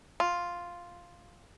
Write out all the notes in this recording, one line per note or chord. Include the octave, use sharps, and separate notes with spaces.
F4